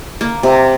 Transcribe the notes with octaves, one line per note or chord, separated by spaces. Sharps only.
A#3
C3